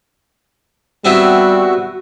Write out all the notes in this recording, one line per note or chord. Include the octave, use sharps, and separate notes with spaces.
G3 B3 C4 E4 F#4